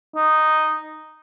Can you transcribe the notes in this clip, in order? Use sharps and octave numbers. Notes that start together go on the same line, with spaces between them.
D#4